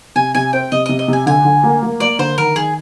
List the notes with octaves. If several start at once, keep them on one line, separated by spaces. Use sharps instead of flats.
C3 G#5
C3 G#5
C4 G5
C3 D#5
C3 D#5
D#5
C3 G#5
D3 G#5
D3
A#3
A#3
A#3 D5
D3 C5
D#3 A#4
D#3 G#4